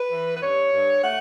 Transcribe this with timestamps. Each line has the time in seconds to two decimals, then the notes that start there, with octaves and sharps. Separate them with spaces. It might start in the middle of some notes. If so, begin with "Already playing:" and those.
Already playing: B4
0.11 E3
0.35 B4
0.42 G2 C#5
0.72 G2
1.03 A3 F#5